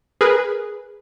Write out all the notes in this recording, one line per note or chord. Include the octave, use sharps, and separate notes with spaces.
G#4 A#4 B4